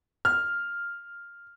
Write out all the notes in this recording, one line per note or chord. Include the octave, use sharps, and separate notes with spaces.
F6